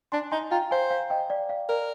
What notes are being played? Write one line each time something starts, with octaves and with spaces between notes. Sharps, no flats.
D4 G#5 C6
D#4 G#5 C6
F4 G5 A#5
C5 F5 G#5
F5 G#5
D#5 G5
D5 F5
D5 F5
A#4 D5